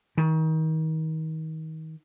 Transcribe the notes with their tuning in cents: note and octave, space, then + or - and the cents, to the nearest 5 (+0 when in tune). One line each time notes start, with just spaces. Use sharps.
D#3 +30